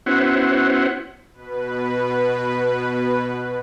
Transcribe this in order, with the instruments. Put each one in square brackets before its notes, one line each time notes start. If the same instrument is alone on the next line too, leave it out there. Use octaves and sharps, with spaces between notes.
[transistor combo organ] B3 C#4 E4 F#4 C5 F#5
[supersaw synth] B2 B4